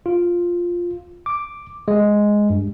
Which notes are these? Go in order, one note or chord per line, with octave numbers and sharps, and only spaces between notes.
F4
D6
G#3
G2